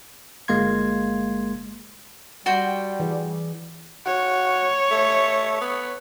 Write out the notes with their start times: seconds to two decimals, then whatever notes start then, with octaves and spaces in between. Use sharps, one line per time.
0.48 G1 G#3 A#3 F5 C6 G#6
2.46 G3 F#4 G5 C6
3.00 E3 G#4 D5
4.06 F#4 C#5
4.91 A3
5.61 B3